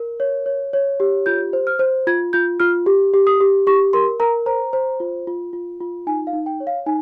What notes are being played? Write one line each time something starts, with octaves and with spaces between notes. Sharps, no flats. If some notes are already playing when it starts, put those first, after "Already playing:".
Already playing: A#4
C#5
C#5
C#5
G4
F4 G6
C5
F6
C5
F4 G#6
F4 G6
F4 F6
G4
G4
D#6
G4
G4 C#6
A#4 C6
A#4 A#5
C5 A#5
C5
F4
F4
F4
F4
D#4 G#5
F5
D#4
G5
C#5
F5
D#4 G#5